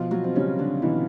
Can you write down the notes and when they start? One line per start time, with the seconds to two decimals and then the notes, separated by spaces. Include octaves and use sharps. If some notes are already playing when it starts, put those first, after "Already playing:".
Already playing: B2 F3 F4
0.11 F#3 F#4
0.24 C4
0.35 C#3 G3 C#4
0.59 D3 D4
0.82 B2 E3 E4